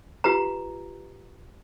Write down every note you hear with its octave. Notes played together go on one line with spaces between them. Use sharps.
F4 G4 B4 A#5